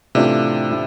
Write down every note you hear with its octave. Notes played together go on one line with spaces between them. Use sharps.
A2 C3 E3 A3 D4 F4
A2